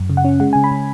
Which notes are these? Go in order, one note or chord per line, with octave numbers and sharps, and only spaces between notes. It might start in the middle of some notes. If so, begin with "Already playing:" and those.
Already playing: F#2
C#3
F#5
C#4
G#3 F#5
C#3 G#5
B5
C#3